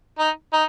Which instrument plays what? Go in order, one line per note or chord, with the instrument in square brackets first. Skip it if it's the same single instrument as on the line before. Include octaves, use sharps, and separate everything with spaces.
[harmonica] D#4
D#4